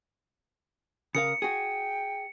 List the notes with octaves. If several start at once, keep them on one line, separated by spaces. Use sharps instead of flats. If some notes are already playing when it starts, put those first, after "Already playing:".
C#3 A#4 F5 D#6 C#7
F#4 G#4 G5